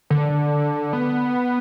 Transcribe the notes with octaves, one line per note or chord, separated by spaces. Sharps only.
D3
B3